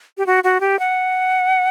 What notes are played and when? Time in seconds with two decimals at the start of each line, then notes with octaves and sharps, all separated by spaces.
0.18 G4
0.26 F#4
0.44 F#4
0.60 G4
0.79 F#5